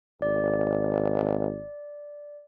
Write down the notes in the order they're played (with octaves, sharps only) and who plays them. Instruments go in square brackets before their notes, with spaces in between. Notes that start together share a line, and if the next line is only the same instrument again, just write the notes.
[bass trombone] G#1 [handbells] D5